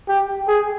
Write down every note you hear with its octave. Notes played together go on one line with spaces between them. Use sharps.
G4
G#4